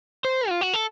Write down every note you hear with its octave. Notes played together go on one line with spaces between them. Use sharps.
C5
F4
F#4
A4